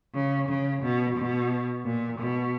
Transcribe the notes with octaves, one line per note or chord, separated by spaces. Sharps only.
C#3
C#3
B2
B2
A#2
B2